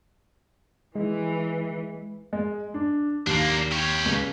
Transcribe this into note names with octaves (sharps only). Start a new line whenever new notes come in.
E3 G#3
G#3
D4
D#2 A#3 D4 C7
G4 C#5
C#2